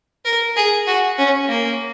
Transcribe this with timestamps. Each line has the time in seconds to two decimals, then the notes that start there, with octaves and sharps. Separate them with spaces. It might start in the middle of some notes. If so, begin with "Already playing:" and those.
0.25 A#4
0.56 G#4
0.87 F#4
1.18 C#4
1.49 A#3